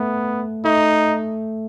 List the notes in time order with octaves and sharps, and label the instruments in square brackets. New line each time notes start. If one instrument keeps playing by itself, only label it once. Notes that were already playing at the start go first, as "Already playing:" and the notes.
Already playing: [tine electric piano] A3 [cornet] B3
[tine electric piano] A3 [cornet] D#4